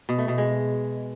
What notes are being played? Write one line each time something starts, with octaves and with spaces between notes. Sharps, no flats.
B2
A3
B2
G#3